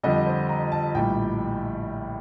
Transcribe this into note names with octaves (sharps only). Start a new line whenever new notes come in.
F2 D3 G3 D#5
C5
A#5
A5
A#1 A2 G3 G5